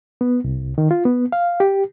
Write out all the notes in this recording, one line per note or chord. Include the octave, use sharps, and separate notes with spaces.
B3
C2
D#3
F4
B3
F5
G4